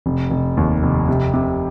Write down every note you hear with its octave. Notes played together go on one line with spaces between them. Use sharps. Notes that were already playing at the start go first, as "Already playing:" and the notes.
F1
F1
D#2
F1
C3
C3